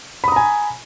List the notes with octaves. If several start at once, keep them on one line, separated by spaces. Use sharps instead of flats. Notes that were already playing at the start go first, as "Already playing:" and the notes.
G#5 A#5 B5 D#6